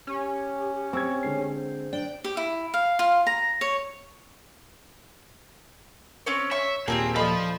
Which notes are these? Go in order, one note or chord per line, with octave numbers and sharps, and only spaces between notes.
C#4 G4
C4 C#6 E6 G#6
D3 G#3 C7
C5
D4 G5
G4
E4
F5
F4
A#5
C#5
C4 C#4 C#5
C#5 E5 C#6
D#2 A#2 A#3 C4 G4 G#4 A5
F3 F4 A4 C5 D#5 B5